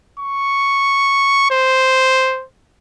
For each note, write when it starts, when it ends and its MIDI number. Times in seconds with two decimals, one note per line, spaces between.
0.20 1.47 85
1.51 2.44 72